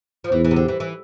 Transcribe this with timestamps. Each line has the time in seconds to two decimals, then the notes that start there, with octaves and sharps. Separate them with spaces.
0.24 F3
0.32 E2 E3
0.45 E3
0.51 C3
0.56 D3
0.68 E3
0.80 E3